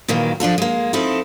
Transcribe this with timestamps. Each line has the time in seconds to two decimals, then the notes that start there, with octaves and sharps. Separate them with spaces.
0.08 A#2 D#3 E3 F#3 A#3
0.40 F3 D4 F4 A4
0.58 G#3 A#3
0.93 F3 C4 D#4 E4 A4